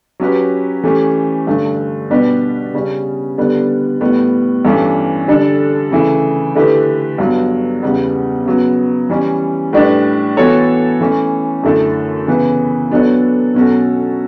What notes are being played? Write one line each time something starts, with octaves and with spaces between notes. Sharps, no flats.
F#3 C#4 G4 B4
E3 A3 C#4 G4
G2 D3 A3
B2 G3 D4 G4 B4
C#3 G3 C#4
D3 G3 B3 D4
A2 G3 B3
G2 E3 A3 C#4 G4
D3 G3 D4 A4
C#3 E3 A3 E4
D3 A3 E4 G4 B4
G2 F#3 B3
E2 C#3 G3 B3
C#3 F#3 B3
E3 G3 C#4
A2 G3 D4 G4 B4
E3 B3 F#4 A4 C#5
E3 A3 C#4
F#2 D3 A3 E4 A4
C#3 E3 B3 E4 B4
F#3 B3 D4 A4 C#5
B2 F#3 C#4 F#4 A4